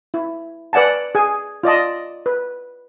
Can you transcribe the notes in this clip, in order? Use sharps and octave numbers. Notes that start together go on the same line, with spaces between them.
E4
B4 D5 F#5 G#5 A5
G#4 G#5
F4 D5 D#5 A5
B4